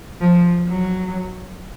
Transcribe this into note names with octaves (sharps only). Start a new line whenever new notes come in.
F3
F#3